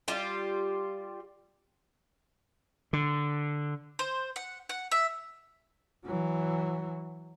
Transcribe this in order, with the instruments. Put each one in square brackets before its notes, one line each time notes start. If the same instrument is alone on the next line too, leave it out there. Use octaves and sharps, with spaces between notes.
[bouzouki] G3 F4 G4
[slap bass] D3
[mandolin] C5
F#5
F#5
E5
[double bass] E3 F#3